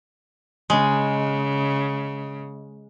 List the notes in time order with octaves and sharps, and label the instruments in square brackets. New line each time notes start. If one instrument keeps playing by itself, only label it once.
[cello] C#3 [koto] G#3